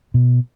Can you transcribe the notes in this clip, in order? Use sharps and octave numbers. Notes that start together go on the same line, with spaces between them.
B2